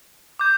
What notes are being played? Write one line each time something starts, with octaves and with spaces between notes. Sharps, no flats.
D6 G6